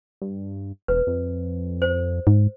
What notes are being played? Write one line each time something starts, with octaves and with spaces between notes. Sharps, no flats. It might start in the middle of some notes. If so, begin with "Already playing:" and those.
G2
E1 B4
F2
C5
G#2